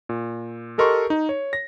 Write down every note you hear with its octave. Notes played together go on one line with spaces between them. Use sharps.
A#2
G4 A4 A#4 D#5 C6 C#6
D#4
C#5
A#6